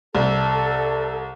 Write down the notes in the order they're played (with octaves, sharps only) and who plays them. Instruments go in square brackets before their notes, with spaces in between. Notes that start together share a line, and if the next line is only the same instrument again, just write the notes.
[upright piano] C2 [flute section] A4